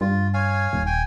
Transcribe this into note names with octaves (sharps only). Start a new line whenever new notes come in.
G2 F4
C#5 F5 G#5
D#1
G5 G#5